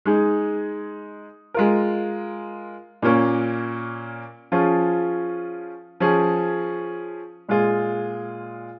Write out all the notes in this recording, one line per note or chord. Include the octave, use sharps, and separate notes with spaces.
G#3 D#4 G#4
G#3 F4 A#4
A#2 A#3 C#4
F3 C#4 F4 G#4
F3 C#4 G#4
A#2 G#3 F4 G#4